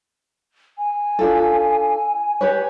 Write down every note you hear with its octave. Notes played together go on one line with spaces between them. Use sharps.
G#5
D4 F4 A4
G4 B4 C#5